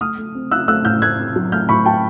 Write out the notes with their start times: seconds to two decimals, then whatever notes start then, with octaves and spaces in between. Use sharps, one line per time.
0.01 A3 D#6 F6
0.18 A3
0.35 C4
0.51 A3 E6 F#6
0.68 A3 E6 F#6
0.85 A2 F6 G6
1.02 A3 F#6 G#6
1.19 C4
1.36 F#3
1.52 A3 F6 G6
1.69 A2 B5 C#6
1.86 F#3 G5 A5